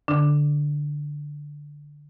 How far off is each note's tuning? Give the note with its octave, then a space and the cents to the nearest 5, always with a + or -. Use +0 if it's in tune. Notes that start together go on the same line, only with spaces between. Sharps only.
D3 +0 D4 +0